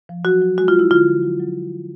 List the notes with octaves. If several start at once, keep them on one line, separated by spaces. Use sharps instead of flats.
F3
F#3 F#4
F#3
G#3 F#4
F4
G#3 E4
D3 F4
F3
F#3
F#3